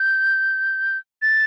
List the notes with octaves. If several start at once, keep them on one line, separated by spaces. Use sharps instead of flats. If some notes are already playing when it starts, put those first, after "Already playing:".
Already playing: G6
A6